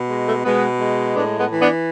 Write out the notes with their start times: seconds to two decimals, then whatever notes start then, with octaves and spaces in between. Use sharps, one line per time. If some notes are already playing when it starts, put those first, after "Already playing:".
Already playing: B2
0.10 G#3
0.27 A3
0.45 B2 G#3 B3
0.80 G#3
1.15 A2 B3 D4
1.38 G#3 B3
1.51 E3
1.62 B3 D4